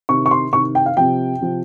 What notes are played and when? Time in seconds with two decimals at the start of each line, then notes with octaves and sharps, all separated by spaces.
0.09 C3 D#3 C#6
0.26 C#6
0.31 C6
0.53 C3 C#6
0.56 D#3
0.75 G5
0.86 F5
0.97 C3 F3 G5
1.41 C3 F3